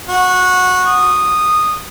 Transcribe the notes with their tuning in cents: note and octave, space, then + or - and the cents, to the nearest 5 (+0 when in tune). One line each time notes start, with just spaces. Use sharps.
F#4 -15
D#6 -10